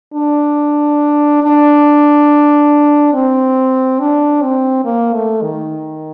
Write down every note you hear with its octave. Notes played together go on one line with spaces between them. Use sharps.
D4
D4
C4
D4
C4
A#3
A3
D#3